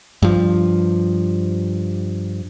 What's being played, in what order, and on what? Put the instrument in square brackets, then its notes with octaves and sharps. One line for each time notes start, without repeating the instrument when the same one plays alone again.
[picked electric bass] G2 F3